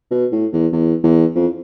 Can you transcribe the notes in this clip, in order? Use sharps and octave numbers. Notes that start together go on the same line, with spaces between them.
B2
A2
E2
E2
E2
F2